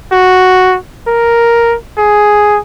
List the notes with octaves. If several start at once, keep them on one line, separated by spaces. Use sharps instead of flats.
F#4
A#4
G#4